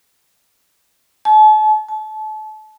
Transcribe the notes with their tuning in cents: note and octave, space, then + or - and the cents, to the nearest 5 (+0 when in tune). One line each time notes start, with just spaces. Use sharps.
A5 -40
A5 -30